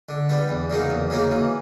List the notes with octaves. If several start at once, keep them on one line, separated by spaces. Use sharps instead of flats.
D3
G3 B3 D4
E2
C#3 F#3 A#3 D#4
E2
C#3 F#3 A#3 D#4
E3